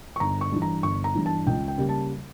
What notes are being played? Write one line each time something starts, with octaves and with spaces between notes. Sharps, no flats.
C#6
G1 A#5
C#6
G2 E3
A#5
G1 C#6
A#5
G2 E3
A5
C#2 G5
G5
C#3 G3 A#3
A5